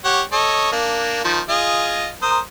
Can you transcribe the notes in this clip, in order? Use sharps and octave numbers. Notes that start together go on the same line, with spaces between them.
G4 C#5 F#5
A4 C#5 D#5
A#3 D4
D#3 F3
F4 G#4 D#5
A#4 C5 D#6